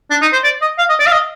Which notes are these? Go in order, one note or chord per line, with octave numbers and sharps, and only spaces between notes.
D4
D#4
C5
D5
D#5
F5
D#5
D5
F5
D#5